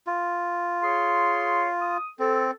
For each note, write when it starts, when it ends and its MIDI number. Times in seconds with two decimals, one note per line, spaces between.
0.07 1.97 65
0.82 1.68 68
0.82 1.68 73
0.82 1.68 84
1.81 2.07 87
2.19 2.51 60
2.19 2.49 69